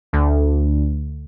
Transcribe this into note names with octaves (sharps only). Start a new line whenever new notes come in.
D2